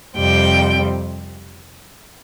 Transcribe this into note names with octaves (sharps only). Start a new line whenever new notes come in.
F2 C3 G3 C4 G5